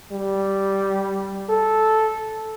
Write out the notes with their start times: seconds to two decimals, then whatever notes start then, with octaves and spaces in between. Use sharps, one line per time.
0.12 G3
1.49 A4